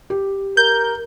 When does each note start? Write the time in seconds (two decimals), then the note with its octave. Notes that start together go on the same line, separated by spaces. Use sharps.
0.10 G4
0.57 A#4 G6